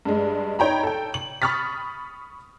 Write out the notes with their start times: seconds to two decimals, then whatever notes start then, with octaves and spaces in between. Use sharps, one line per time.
0.05 G2 G#3
0.59 D#4 C#5 G5 A#5 B5
0.83 A4 G5
1.14 F#7
1.42 B5 C#6 D#6 F6 A6 B6